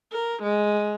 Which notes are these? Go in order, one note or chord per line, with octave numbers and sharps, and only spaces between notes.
A#4
G#3